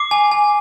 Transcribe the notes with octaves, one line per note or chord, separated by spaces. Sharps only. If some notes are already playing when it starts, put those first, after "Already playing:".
Already playing: D6 C7
G#5
G#5